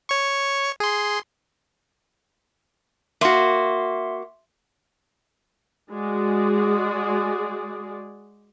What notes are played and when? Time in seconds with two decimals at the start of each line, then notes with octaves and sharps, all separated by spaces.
0.09 C#5 C#6
0.80 G#4 C6
3.21 A#3 F#4 E5 C6
5.91 G#3 F#4 G#4 D5